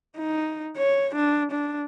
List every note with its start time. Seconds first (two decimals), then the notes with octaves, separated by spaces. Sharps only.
0.17 D#4
0.77 C#5
1.15 D4
1.52 D4